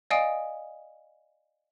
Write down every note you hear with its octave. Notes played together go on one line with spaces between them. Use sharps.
D5 D#5 F5 G#5 D#6 D7